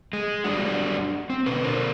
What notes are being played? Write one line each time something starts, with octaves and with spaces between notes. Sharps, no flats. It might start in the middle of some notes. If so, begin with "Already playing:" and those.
G#3
F#2 G3 D4 F#4
C4
B2 D3 B4
D3 A#4 C5